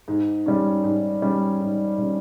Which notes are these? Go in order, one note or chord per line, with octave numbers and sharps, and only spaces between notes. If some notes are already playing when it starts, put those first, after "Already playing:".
G#2
G3 C#4
G#2
G3 C#4
G#2
G3 C#4